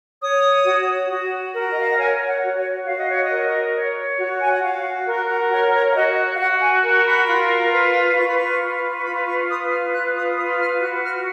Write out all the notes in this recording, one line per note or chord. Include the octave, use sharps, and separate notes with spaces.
C#5 D#6
F#4
F#4
A#4
D#5
F5
F#5
C#5 G#5
F#5
F#4
C#5
F#4 F5
D#5
C#5
D#5
A#4
C#5
F#4
G#5
F#5
F#4 F5
A#4
C#5 F#5
C#5
F5
F#4 D#5
F5
F#4 F#5
G#5
A#4
B5
F4
B4
F4 C#6
B5
C#6
B4
C#6
F4 B5
C#6
B4 D#6
F6
F4 F#6
D#6
B4 D#6
F6
F#4 F#6
F6